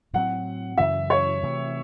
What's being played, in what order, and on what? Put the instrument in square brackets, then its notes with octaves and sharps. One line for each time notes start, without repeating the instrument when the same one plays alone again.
[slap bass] A2 F#3 C4 [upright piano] F#5
[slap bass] F#2 C#3 E3 [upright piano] E5
[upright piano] C#5
[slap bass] C3 E3 A3